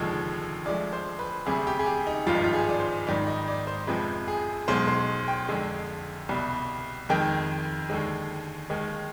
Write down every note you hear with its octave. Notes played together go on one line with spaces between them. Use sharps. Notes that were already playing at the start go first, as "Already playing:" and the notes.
Already playing: F1 D#2 D3 F3 G#3
D2 D3 F3 G#3 D5
C5
B4
D2 C3 G3 G#4
G4
G#4
G4
D#4
G#1 G2 F3 G#3 F4
D#4
F4
G#4
D5
C5
G#1 G#2 D#3 G3 D5
D#5
D5
C5
F2 C3 F3 G#3 B4
G#4
B1 B2 G#3 C5
C5
G5
F2 D3 G#3
C2 B2 G3
F2 D#3 G#3 G5
D#2 D3 G#3
D#2 D#3 G#3